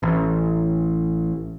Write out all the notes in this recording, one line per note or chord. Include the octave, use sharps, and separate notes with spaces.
A1